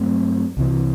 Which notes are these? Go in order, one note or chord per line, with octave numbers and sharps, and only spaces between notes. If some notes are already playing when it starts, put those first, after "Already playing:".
Already playing: G2 F#3 A3 C4
C2 C3 E3